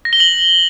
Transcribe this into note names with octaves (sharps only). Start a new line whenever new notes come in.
A#6
G7
F#7